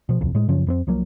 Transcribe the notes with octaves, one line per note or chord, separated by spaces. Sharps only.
B2 F3
D1 C2 F2
A2 G#3
F#2 C#3 F3 C#4
F2 B3 C4
C2 F3 F#3 A#3